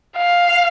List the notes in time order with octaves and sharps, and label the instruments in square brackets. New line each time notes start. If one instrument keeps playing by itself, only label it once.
[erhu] F5